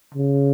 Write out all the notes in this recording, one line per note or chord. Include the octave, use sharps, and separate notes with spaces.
C#3